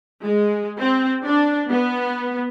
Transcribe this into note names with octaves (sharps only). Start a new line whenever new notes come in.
G#3
C4
D4
B3